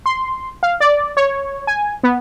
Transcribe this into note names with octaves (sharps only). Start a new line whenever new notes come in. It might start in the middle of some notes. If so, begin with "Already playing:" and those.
C6
F5
D5
C#5
G#5
B3